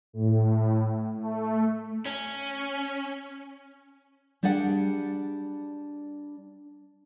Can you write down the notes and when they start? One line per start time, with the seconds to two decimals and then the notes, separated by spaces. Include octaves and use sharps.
0.13 A2
1.17 A3
2.06 C#4
4.43 G3 D4 G#4 D5 F#5